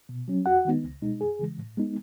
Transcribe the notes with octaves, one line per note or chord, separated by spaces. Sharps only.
B2
F#3 C#4
E2 F#4 F#5
D#3 G#3 B3 D#4
C#2
B2 G#3 D#4
F#2 G#4
C#3 E3 G#3
A2
G#3 B3 D#4